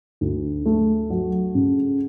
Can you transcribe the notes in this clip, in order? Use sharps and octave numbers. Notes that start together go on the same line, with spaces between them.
D2
A3
F#3
C#3